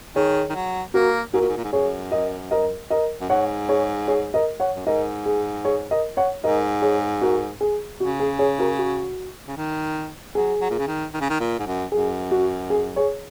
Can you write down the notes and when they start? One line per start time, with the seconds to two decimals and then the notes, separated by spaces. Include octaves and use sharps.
0.16 D#3 G#4 C#5
0.50 D#3
0.55 F#3
0.94 A#3 F#4 A#4
1.33 G#2 F#4 A#4
1.41 A#2
1.48 G#2
1.57 A#2
1.64 G#2
1.72 F#2 G#4 C#5
2.11 A#4 D#5
2.51 A#4 D#5
2.90 A#4 D#5
3.21 F#2
3.29 G#2 C#5 F#5
3.69 G#4 C#5
4.08 G#4 C#5
4.34 A#4 D#5
4.60 C#5 F#5
4.76 F#2
4.86 G#2 A#4 D#5
5.26 G#4
5.65 G#4 C#5
5.91 A#4 D#5
6.17 C#5 F#5
6.43 G#2 A#4 D#5
6.82 G#4 C#5
7.21 F#4 A#4
7.61 G#4
8.00 C#3 F#4
8.20 G#4
8.39 G#4 C#5
8.59 F#4 A#4
8.78 F#4
9.48 C#3
9.57 D#3
10.35 F#3 G#4
10.61 F#3
10.71 A#2
10.79 C#3
10.87 D#3
11.14 D#3
11.21 C#3
11.30 D#3
11.40 A#2
11.60 G#2
11.67 F#2
11.92 F#2 G#4
12.31 F#4
12.70 G#4
12.96 G#4 C#5